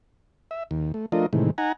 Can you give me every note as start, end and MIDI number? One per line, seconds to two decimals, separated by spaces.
0.51 0.63 76
0.71 0.92 39
0.94 1.06 57
1.12 1.26 53
1.12 1.26 57
1.12 1.26 62
1.12 1.26 65
1.12 1.26 70
1.12 1.26 75
1.33 1.51 45
1.33 1.51 48
1.33 1.51 51
1.33 1.51 52
1.33 1.51 56
1.58 1.72 63
1.58 1.72 78
1.58 1.72 80
1.58 1.72 82